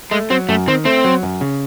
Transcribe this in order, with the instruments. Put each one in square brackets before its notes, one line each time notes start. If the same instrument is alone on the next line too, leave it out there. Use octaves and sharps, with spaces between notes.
[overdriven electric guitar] G#3 [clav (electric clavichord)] A3
[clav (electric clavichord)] F#3 [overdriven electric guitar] C4
[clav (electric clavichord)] F#2 [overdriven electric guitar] A3
[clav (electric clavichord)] D#3 [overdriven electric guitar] C4
[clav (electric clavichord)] A3 [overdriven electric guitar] C4
[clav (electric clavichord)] F#3
F#2
C#3